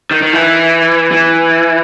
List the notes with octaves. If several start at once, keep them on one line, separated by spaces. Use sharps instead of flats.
D#3
D#3
E3
E3